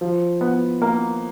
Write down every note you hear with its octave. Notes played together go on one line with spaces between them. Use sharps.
F3
B3
A#3